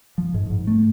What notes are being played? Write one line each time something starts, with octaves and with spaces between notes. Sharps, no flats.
F3
G#2
G#2
A3